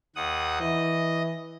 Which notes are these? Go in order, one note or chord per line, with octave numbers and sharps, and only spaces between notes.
D#2 F#5 D#6
E3 D#5